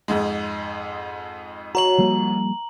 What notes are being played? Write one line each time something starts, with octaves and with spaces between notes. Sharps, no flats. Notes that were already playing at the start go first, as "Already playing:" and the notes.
F2 G#2 G#3
F#4 C#5 A#5 F#7
F3 G3 A#3